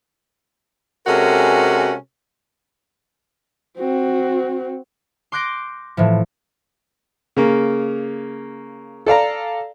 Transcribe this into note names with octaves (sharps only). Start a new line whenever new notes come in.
C3 G#3 C#4 F#4 A4 A#4
C4 F#4
C6 D6 F#6 G6 A#6 D7
A2 E3 F3
C#3 A#3
A4 D5 F5 A#5